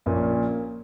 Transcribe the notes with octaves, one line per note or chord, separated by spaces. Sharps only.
A#1 A#2 A#3 C#4